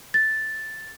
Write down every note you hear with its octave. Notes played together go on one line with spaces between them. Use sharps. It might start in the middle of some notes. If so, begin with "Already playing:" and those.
A6